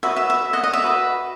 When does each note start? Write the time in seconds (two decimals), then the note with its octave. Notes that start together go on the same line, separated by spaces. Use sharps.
0.03 F#4 B4 D#5 E5
0.16 E5
0.30 E5
0.53 D#5 F#5
0.63 D#5
0.73 E5
0.83 F#4 B4 D#5